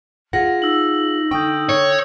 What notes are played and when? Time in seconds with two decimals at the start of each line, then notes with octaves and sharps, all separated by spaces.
0.33 F4 G#4 F#5 A#6
0.62 D#4 E6 A#6 F#7
1.31 D3 G5 C#6 D#6 G6
1.69 C#5